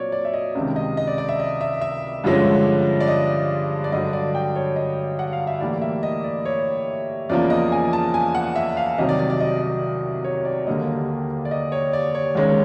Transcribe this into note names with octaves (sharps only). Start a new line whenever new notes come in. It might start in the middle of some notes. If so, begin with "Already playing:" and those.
Already playing: A#2 F#3 C4 C#5 D5
D5
E5
D#5
C#2 C3 D#3
D#5
D#5
D5
D5
E5
D#5
E5
E5
G2 D3 F3 G#3 C#4
D5
D#5
D5
G2 D3 F#3 D#5
D5
G5
C#5
D#5
F#5
F5
E5
A2 E3 G3 A#3 D5
E5
D#5
D5
C#5
E2 C#3 F3 A#3 D5
D#5
G#5
A5
G#5
F#5
E5
F5
C2 C3 D#3 F#3 D#5
D5
D5
D5
D#5
D5
C#5
D5
D#2 D3 G3 A#3 D#5
D5
D#5
C#5
D5
C#5
D#2 D#3 G#3 C#4